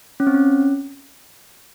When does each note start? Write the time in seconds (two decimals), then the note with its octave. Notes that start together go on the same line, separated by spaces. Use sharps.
0.20 C#4
0.27 C4
0.34 C#4